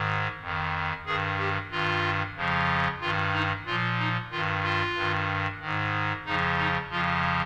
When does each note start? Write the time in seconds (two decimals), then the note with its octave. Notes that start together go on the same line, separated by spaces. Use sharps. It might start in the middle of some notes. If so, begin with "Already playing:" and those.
Already playing: G#2 D#3
0.40 F2
0.46 D#3
1.06 G2 D#3 G#4
1.38 G4
1.70 G2 D#3 F4
2.36 F2 C#3 F3
3.01 G2 D#3 F4
3.33 D#4
3.65 A#2 F3 F4
3.99 D#4
4.31 G2 D#3 F4
4.63 F4
4.95 G2 D#3
5.60 G#2 D#3
6.25 F2 C#3 F3 D#4
6.58 D#4
6.90 F2 C#3 F3 F4